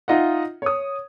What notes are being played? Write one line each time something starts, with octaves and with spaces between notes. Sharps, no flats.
D#4 F4 D#5 E5 F#5
C#5 D#6